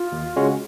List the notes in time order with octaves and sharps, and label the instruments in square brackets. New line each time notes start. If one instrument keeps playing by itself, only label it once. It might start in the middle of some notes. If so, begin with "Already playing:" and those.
Already playing: [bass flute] F4
[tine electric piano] D#2
C#3 G#3 C#4 F#4